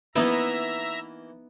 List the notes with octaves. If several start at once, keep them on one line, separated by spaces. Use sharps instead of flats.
E3 A#3 B3 D#4 E4 E5 A#5